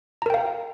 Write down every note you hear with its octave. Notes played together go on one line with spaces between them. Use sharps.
A#4 F5 G5 A#5